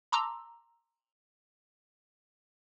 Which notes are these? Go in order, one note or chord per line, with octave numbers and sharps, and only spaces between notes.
A5 A#5 C6 D6 E6